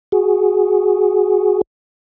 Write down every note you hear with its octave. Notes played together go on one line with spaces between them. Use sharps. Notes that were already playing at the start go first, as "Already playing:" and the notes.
F#4 G#4